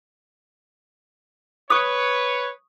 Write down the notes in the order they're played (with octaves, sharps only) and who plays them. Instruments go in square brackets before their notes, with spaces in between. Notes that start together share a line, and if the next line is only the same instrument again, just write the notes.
[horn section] B4 C#5 [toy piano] C#6 D#6